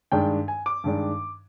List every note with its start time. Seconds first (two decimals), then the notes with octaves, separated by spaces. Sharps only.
0.12 G2 D#3 G#3 D4 G5
0.48 G#5
0.66 D6
0.84 G2 D#3 G#3 D4